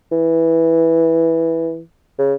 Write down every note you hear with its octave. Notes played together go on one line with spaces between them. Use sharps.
E3
C#3